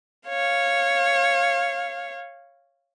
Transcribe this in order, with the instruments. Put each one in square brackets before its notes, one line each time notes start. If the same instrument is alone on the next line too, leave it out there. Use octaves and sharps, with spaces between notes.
[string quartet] C#5 F5